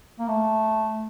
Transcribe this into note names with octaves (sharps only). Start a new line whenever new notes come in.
A#3
A3